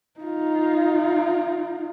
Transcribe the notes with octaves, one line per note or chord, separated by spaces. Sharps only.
D#4 F4